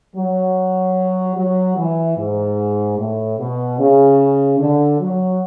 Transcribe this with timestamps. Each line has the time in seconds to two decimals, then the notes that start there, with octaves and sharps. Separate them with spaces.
0.16 F#3
1.36 F#3
1.77 E3
2.17 G#2
2.98 A2
3.38 B2
3.78 C#3
4.59 D3
5.00 F#3